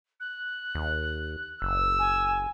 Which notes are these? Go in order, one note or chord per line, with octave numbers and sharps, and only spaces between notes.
F#6
D#2
F#1 E6
G#5